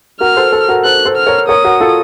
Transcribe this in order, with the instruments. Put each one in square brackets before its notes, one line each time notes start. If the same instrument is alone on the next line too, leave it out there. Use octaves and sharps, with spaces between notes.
[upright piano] F#4 A#4 [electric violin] F6
[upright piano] A4 C5
A4 C5
F#4 A#4
[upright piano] A4 C5 [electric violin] F#6
[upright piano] A4 C5
[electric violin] F6
[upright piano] A#4 C#5
[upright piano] A#4 C#5 [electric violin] D#6
[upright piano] F#4 A#4
F4 A4